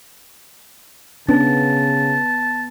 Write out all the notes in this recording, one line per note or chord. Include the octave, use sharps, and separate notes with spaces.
C#3 B3 C#4 D4 B4 A5